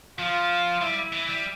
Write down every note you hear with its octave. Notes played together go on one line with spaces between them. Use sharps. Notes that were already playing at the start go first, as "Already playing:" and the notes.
F3 F4
G3 E4
E3
G3